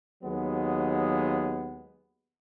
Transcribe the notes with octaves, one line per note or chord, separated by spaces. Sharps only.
D#2 F#3 G#3 B3